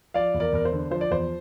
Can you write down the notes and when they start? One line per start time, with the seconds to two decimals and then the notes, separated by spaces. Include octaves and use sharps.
0.14 F3 D5 F5
0.34 E2
0.40 A#4 D5
0.53 E2 A#4
0.65 C5
0.72 D3
0.91 F3 C5
1.01 D5
1.11 E2 C5